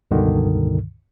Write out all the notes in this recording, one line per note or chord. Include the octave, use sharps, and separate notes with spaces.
C#2 G2 B2 D3 D#3